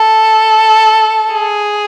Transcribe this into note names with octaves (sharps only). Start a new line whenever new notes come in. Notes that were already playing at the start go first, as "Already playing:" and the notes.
Already playing: A4
G#4